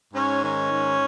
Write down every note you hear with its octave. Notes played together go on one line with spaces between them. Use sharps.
G#2 C#4
D#3 C#4
G#2